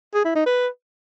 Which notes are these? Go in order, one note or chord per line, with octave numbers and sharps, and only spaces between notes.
G#4
E4
D#4
B4